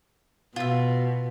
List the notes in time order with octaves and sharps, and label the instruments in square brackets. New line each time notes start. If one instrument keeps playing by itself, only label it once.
[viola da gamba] B2 [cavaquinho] F4 E5